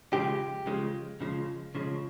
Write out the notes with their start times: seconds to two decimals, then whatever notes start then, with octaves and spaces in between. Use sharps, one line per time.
0.13 C#3 F3 G#3 G4
0.66 C#3 F3 G#3
1.21 C#3 F3 G#3
1.75 C#3 F3 G#3